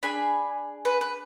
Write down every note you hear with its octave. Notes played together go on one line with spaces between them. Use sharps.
D4 G#4 G#5 B5
B4
B4